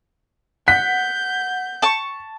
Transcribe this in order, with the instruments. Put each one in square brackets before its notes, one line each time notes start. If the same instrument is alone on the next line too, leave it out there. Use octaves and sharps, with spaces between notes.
[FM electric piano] F#5 [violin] G6 [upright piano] B6
[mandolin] A5 C#6